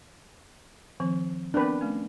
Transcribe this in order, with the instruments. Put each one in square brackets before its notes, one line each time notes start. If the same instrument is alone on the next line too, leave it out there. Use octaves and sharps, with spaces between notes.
[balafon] D#3 F3 C4
[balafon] B3 C4 A#4 [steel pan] D4 B4
[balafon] A3 C#4